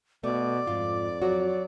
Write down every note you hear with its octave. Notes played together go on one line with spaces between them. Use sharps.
B2 A3 D5
F2 G#2 F4
F#3 F#4